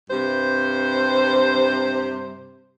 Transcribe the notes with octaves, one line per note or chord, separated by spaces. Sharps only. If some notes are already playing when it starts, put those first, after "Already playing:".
G2 C3 C5